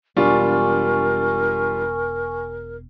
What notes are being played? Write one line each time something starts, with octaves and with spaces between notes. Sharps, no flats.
E1 G3 D4 F4 A#4 G#5 C#6